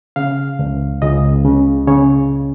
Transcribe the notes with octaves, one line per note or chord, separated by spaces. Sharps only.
C#3 F5
C#2
C#2 D#5
C#3
C#3 C#5